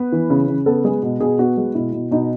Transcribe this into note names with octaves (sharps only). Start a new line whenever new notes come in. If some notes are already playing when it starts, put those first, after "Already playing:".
Already playing: B3 B4
E3
C#3
C#3
B3 A4
G#3 G#4
B2
B2 G#4
B3 F#4
G#3
B2 E4
B2
B2 D#4